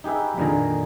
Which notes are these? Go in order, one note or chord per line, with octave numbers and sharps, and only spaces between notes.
D#4 G4 G#4 B4 E5
F2 A#2 D3 D#3 G#4 A#5